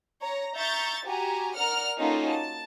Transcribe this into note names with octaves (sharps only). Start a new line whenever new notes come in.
C#5 A#5
E5 A#5 C#6 G6 A6
F#4 G4 G#5 A#5
A#4 D5 F#5 F6
A#3 C#4 D#4 F4 F#4 A4
A5